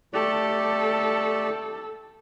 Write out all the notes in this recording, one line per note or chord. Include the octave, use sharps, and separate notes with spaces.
A3 G4 A4 D5